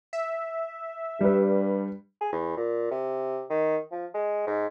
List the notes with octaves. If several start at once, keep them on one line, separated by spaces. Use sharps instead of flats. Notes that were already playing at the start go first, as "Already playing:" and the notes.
E5
G2 G3 B4
G#4
E2
A#2
C3
D#3
F3
G#3
G#2